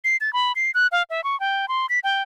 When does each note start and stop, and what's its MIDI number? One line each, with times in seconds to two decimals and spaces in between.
0.04 0.17 96
0.21 0.33 93
0.33 0.52 83
0.56 0.71 96
0.74 0.87 90
0.92 1.03 77
1.10 1.24 76
1.24 1.39 85
1.40 1.68 79
1.68 1.86 84
1.89 1.99 95
2.04 2.23 79